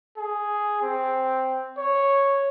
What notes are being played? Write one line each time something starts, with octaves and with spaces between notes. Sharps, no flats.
G#4
C4
C#5